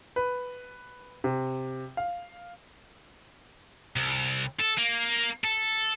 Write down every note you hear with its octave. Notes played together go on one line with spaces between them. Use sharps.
B4
C3
F5
C2
A4
A#3
A4